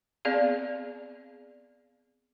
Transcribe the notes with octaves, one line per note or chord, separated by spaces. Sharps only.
B3 C4 G#4 D5 F5